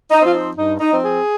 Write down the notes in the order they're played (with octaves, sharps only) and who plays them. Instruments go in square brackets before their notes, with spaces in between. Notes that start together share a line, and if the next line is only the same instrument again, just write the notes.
[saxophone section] D#4
F3 C4 F4
D#4
G2 D#4
D#4
F3 C4
G#4